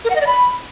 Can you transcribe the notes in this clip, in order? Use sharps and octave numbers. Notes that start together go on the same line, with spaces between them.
A#4
F#5
D#5
D5
B5